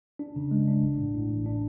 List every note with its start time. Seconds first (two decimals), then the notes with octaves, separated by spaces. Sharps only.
0.19 D4
0.36 C#3
0.51 G#3
0.68 D4
0.82 A1
0.98 A2
1.15 A2
1.30 A1
1.46 D4